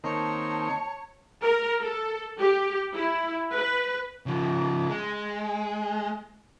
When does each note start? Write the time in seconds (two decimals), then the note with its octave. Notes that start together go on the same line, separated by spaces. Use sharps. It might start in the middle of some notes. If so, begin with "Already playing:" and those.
0.04 D#3 A#3 C4 C#5 A5
1.43 A#4
1.82 A4
2.39 G4
2.93 E4
3.54 B4
4.26 C#3 F3
4.89 G#3